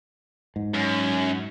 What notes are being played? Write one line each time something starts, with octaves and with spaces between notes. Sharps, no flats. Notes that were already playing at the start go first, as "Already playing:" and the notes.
G#2
F#2